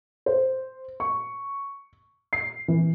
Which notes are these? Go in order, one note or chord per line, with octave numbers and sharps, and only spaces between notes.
C5
C#6
C7
E3